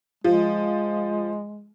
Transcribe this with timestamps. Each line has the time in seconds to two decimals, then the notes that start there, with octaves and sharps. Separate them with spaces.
0.24 F3 G#3